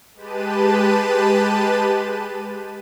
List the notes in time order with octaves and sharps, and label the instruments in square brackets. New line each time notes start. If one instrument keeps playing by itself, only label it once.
[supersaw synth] G#3 G4 B4 A5 D#7